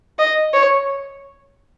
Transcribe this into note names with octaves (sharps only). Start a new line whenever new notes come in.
D#5
C#5